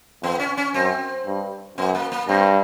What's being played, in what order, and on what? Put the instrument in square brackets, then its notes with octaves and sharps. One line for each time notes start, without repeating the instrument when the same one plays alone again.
[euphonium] F2 [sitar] B3
[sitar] C#4
C#4
[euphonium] F#2 [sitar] C4
[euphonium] G2
[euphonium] F#2 [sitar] B3
[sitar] A#3
A#3
[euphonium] G2 [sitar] C4